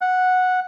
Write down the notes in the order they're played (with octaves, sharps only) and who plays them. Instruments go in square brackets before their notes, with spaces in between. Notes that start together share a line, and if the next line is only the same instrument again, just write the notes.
[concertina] F#5